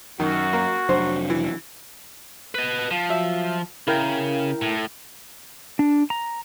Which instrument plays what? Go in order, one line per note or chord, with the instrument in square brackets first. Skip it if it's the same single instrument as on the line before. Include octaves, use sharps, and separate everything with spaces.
[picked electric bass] F#2 [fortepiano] D#3 [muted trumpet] F#4
[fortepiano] A#3
[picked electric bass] F1 F#3 D4 [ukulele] C5
[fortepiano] E3
[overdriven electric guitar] B4 D#5
F3
[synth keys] F#3 E5
[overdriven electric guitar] C#3 [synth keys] E4 A#4 G5
[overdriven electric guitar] A2
[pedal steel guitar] D4
A#5